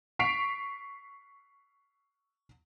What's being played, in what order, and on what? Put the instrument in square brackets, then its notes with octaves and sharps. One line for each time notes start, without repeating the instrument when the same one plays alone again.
[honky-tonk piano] C#6 B6 C7 D7 F7